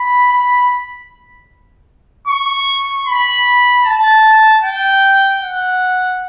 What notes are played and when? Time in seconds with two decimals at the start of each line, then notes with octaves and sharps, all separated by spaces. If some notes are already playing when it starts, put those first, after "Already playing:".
Already playing: B5
0.31 B5
2.28 C#6
3.06 B5
3.85 A5
4.63 G5
5.42 F#5